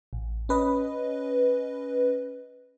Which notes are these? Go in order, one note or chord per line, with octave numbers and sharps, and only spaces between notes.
A1
C#4 B4 D#5